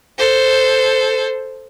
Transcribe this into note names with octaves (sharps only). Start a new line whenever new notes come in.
A4 C5